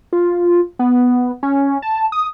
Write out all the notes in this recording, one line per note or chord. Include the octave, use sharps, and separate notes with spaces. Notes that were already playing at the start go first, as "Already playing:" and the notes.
F4
B3
C#4
A5
D#6